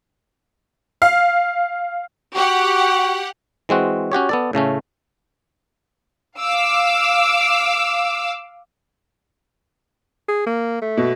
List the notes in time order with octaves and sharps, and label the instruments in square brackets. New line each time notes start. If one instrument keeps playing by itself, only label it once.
[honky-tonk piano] F5
[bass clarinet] F#4 [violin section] G4 F#5
[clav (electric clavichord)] E3 G#3 C4 F#4
C#4 F#4 G4 C#5
B3 A4 D5
A2 C#3 A3 C#4
[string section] F5 D6 E6
[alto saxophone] G#4
A#3
A3
[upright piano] B2